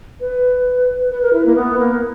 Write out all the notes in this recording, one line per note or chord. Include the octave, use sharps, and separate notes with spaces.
B4
B4
A#4
E4
A#3
B3
A#3